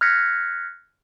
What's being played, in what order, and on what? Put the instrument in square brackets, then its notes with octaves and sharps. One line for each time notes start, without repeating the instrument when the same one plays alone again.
[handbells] F6 F#6 G#6 A#6 B6 C#7